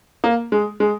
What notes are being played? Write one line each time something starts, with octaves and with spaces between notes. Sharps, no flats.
A#3
G#3
G#3